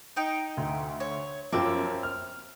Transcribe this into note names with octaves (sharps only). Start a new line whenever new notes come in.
D#4 G5
D2
C#5
F#2 F3 C4 E5 D6
F6